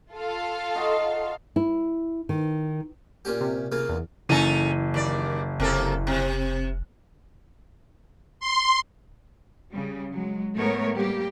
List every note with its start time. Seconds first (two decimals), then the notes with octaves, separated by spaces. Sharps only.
0.13 F4 A4 F5
0.75 D#4 F#4 C6
1.56 E4
2.29 D#3
3.25 A#2 C#4 G4
3.41 C3
3.72 C#3 A#3 F4
3.89 E2
4.29 F#1 E3 C#4 D#4 A4 D#7
4.94 D#2 D5
5.60 F1 C3 A#3 A4
6.07 C3
8.40 C6
9.72 C#3 G3
10.11 F#3 G#3
10.56 A2 G#3 A3 B3 A#4 C#5
10.96 G3 A#3 G4